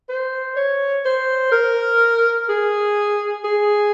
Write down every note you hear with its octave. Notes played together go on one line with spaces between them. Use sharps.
C5
C#5
C5
A#4
G#4
G#4